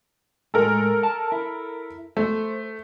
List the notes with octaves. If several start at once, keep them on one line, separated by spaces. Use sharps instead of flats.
A2 G#3 A4 A#4
A5
E4
A3 C5